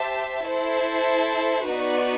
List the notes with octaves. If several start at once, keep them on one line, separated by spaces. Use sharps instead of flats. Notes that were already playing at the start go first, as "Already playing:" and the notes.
Already playing: G4 C5 E5 A5
E4 A4 C5
B3 D#4 F#4 B4 D5